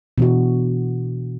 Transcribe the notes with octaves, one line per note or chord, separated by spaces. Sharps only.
B2 E3 D4 F#4